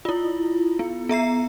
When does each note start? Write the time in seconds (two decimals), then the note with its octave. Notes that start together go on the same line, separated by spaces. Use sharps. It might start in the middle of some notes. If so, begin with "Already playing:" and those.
0.05 E4 F4
0.79 B3
1.09 B3 E5 A#5 C7